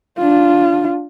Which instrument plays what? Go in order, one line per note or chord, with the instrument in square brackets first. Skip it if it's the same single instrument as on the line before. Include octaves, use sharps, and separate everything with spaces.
[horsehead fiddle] D4 F4